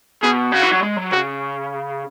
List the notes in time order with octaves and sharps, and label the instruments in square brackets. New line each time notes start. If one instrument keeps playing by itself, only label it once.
[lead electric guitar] B2 [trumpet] G#4
[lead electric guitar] C#3 [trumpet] F#4
[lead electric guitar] E3
F#3
G#3
F#3
[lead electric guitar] C#3 [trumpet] F#4